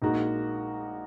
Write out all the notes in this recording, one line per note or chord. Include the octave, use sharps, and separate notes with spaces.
A#1 A#2 G#3 D#4 F#4 A#4